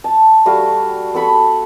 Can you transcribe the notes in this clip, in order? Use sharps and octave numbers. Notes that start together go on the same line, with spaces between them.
A5
G3 A3 F#4 F5
B3 A4 B5 C#6